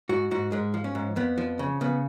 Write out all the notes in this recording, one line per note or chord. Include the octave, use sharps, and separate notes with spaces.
G#2 F#4
G#2 F#4
G#2 G#3
F3
C#4
G#2
F2 B3
F3
C#3
C#3 B3